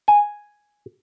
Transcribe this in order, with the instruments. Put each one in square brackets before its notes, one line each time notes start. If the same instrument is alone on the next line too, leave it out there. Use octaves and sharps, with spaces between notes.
[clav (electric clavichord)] G#5